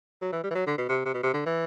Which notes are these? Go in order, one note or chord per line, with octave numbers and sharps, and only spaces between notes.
F#3
E3
G3
E3
F#3
D3
B2
C3
C3
B2
C3
D3
E3